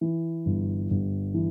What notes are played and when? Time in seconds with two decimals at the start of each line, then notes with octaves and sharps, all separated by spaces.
0.01 E3
0.46 G1
0.90 G1
1.34 E3